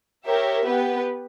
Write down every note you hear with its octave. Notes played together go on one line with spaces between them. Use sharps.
G4 A#4 C#5 E5
B3 G4 B4